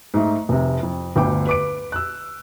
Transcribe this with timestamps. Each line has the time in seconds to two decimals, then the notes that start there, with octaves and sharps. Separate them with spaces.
0.14 G#2 A3 D#4
0.49 F1 C3
0.83 F2
1.16 G1 D2 D3 G5 D6
1.47 B4 D6 D7
1.92 E6 F#6